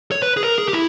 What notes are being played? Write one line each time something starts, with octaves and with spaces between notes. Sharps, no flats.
C#5
B4
G#4
A#4
G#4
G4
E4